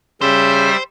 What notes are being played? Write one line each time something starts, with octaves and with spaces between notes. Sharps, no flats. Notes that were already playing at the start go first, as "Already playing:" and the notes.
C#3 G3 C5 E5